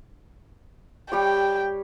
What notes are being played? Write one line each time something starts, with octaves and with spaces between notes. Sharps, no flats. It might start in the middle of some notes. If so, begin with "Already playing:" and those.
G3 G4 C#5 G5